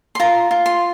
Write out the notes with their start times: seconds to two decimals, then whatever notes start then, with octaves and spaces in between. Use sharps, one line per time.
0.15 C6
0.20 F4 A#5
0.51 F4
0.66 C6